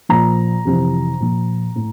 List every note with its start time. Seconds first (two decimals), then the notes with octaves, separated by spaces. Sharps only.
0.09 A#2 F3 A#5
0.65 F2 C3 E3
1.20 A#2 F3
1.76 A2